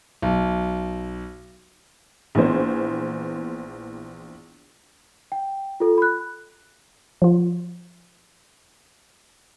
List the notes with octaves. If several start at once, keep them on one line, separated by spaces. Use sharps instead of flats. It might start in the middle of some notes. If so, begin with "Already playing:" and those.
B1
A#1 E3 B3 C5
G5
F4 A4
B5 F#6
F3 F4